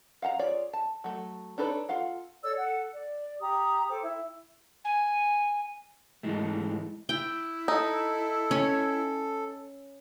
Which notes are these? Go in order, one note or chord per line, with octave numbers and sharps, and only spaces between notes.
F5 F#5 A5 A#5
F4 G#4 C#5 D5
A5
F#3 A3
D4 D#4 A4 B4 C#5
F4 A4 F5 F#5
A4 C#5 D5 E6
A4 F#5
D5
G4 A#5 D#6
A4 C5 G5 D6
E4
G#5
G#2 E3 G#3 A3
E4 G5
D#4 A4
C#4